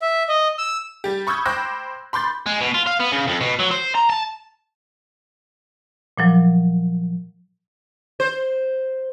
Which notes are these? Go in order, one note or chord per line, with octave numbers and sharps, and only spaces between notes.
E5
D#5
E6
G3 G4
B5 C#6 D#6 E6 G6 G#6
C5 G5 B5 D6 F#6 A#6
B5 C6 D6 G6 A6
G#3
B2
F4
F5
B3
C#3
F2
B2
F#3
C5
A#5
A5
A#2 F3 F#3
C5